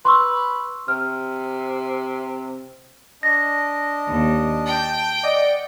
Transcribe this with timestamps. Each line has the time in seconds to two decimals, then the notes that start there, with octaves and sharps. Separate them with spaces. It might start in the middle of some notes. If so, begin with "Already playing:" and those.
0.05 B4 C6 C#6 E6
0.88 C3 F6
3.23 D4 D#5 A#6
4.07 D#2
4.66 G5 A5 G6
5.23 D5 D#5 F#5